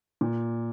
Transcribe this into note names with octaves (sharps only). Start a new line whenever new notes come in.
A#2